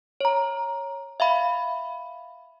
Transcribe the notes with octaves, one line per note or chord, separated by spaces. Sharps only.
C#5 A#5
E5 F5 B5